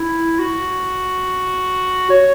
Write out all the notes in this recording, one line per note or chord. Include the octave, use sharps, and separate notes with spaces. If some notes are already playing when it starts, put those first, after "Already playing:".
Already playing: E4
F#4
C#5